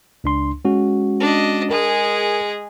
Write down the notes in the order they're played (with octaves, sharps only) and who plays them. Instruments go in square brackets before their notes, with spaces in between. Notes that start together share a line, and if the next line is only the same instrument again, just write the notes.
[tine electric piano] C#2 D4 C6
G#3 C#4 F#4
[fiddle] D4 D#5
[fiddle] G#3 G#4 [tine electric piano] A#4